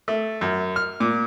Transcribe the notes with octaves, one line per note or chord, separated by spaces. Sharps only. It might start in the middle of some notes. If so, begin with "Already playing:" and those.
A3
F#2
F6
A#2